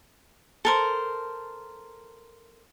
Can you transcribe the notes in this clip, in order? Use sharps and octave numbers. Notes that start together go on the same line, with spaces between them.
A4 A#4 C5